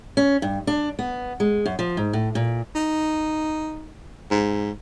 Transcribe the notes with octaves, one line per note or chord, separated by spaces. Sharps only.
C#4
G2
D4
B3
G#3
F#2
F3
G#2
A2
A#2
D#4
G#2